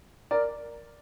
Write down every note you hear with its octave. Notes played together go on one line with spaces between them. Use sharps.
A#4 D5